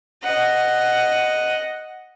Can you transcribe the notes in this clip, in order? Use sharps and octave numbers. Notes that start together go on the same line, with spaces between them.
D#5 F#5